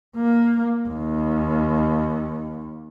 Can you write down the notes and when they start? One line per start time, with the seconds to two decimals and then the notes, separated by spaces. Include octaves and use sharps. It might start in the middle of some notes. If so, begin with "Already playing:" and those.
0.16 A#3
0.88 D#2